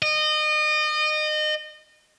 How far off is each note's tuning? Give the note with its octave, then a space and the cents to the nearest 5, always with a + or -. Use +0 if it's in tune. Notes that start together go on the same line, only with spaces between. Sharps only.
D#5 -30